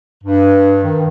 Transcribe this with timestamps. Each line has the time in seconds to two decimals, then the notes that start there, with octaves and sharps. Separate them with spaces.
0.24 G2
0.83 D#3